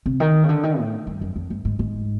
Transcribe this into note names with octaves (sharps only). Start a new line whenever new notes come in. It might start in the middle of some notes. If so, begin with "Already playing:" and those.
C3
D#3
C#3
D3
D#3
A2
G2
F#2
F2
G2
G#2
G#2